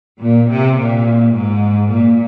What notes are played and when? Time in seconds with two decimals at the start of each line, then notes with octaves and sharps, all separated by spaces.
0.21 A#2
0.49 C3
0.78 A#2
1.35 G#2
1.91 A#2